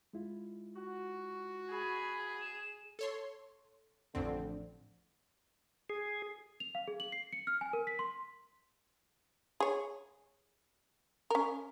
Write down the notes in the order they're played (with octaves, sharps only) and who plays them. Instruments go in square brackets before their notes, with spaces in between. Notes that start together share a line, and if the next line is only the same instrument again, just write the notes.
[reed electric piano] G#3 E4 F4
[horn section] F#4
[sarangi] G#4 [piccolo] B5
[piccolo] E7
[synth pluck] A4 C#5 C6
[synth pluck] A1 F2 C4 [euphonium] D3
[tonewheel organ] G#4
[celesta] F7
F5
G#4
F#7
C7
C#7
F6
G#5
A#4
B6
C6
[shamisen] G#4 C#5
C#4 A#4